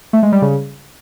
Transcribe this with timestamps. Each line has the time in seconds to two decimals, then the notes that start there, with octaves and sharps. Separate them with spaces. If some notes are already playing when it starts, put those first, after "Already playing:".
0.13 A3
0.23 G#3
0.32 G3
0.42 C#3